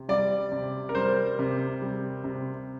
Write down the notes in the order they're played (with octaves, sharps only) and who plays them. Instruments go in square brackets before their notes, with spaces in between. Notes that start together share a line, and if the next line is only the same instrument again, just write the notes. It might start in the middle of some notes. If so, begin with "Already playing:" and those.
Already playing: [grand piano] C3
G3 D5
C3
A#4
G3 C5
C3
G3
C3